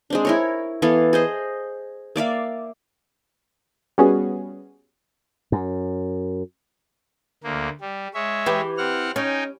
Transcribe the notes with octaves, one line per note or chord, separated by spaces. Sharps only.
G#3 C4 D4
E4 A#4 C#5
E3 B3 A4 F5
G#4 C5 D#5
A#3 D5 E5 F5
G3 B3 C#4 F#4 G#4
F#2
D2 A#3
G3
G#3 C#5 E5
E3 G4
C4 F#5 F6
C#4 D#4 G5 G#5